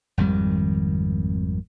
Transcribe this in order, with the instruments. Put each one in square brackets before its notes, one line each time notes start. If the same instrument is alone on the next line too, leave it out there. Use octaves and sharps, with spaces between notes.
[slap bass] G#1 F2 D#3 G3